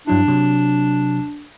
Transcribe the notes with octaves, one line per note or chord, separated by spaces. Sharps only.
G2 F#3 D4 E4
C3 F#3